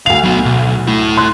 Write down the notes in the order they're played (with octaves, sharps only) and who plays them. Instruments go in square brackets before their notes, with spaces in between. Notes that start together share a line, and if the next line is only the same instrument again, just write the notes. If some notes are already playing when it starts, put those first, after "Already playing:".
[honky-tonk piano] D2 F7 [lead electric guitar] F5
[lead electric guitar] F#3 B3
B1
A3 E4
[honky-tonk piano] C6 F#6